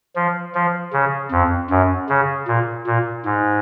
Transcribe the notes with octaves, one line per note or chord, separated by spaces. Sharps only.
F3
F3
C#3
F2
F#2
C#3
A#2
A#2
G#2